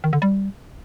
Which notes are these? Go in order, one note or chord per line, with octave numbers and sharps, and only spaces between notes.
D#3
D3
G3